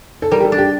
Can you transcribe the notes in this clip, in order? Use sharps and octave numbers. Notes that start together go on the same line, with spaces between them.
A4
G3 A#4
G4
A4
D4
G4